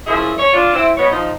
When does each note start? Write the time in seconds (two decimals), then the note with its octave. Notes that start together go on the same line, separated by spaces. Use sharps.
0.07 F#2 F3 E4 G#4 E5
0.38 C#5
0.53 D4 F4
0.73 C4 E4
0.97 B2 B3 C#5
1.11 F3 D#4